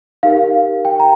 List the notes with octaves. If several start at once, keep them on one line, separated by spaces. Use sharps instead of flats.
D#4 G4 A#4 F5
G5
A#5